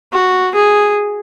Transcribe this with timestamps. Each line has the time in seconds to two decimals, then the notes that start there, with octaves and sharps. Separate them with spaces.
0.13 F#4
0.55 G#4